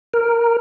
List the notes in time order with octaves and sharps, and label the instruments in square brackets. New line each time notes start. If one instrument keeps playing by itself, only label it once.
[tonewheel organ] A#4